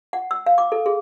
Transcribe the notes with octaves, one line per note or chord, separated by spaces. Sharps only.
F#5
E6
F5
D6
A4
G#4